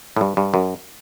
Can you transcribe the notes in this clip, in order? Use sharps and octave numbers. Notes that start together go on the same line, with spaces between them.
A2
G2
G2
F#2